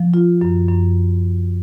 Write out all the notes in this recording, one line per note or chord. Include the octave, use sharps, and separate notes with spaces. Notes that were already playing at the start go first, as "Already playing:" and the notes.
Already playing: F3
F4
F#2
F#2